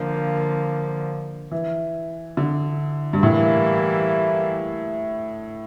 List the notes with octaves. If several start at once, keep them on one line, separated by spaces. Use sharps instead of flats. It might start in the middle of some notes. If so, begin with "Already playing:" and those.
Already playing: D3 F3 A#3
E3
D3
G2
A2 E3 G3 A#3 E4